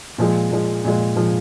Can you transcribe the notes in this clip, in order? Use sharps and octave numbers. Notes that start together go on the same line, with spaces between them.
A#2 F3 G#3
A#2 F3 G#3
A#2 F3 G#3
A#2 F3 G#3